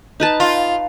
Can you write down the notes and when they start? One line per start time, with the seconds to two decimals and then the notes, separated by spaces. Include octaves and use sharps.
0.20 D#4 B4 A5
0.40 F4